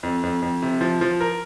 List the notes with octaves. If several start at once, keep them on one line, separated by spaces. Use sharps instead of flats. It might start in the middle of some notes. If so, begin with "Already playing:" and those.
F2
F2
F2
C3
F3
F3
A#4